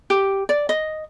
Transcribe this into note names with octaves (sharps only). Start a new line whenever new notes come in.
G4
D5
D#5